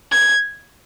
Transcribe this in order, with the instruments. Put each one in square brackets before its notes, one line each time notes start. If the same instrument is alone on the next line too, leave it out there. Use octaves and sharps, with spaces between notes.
[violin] G#6